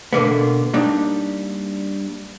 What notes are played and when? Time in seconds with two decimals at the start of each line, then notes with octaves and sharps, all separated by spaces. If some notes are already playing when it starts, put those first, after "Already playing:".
0.13 B2 D3 A#3 B3
0.74 G3 A#3 D4 D#4